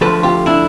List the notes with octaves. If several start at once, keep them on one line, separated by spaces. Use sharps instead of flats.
D2 D3 F3 A4 B4
F4 G4
D4 E4